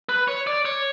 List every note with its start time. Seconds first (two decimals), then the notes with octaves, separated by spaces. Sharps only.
0.09 B4
0.28 C#5
0.47 D5
0.65 C#5